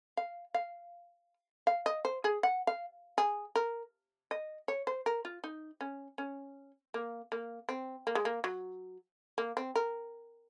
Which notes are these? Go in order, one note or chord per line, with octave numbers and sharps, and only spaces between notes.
F5
F5
F5
D#5
C5
G#4
F#5
F5
G#4
A#4
D#5
C#5
C5
A#4
F4
D#4
C#4
C#4
A#3
A#3
C4
A#3
G#3
A#3
F#3
A#3
C4
A#4